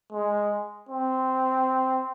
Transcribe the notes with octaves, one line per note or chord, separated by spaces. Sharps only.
G#3
C4